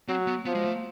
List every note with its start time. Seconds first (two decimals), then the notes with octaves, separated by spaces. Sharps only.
0.08 F#3 C4
0.27 B3
0.45 F3 B3
0.55 G#3
0.65 A3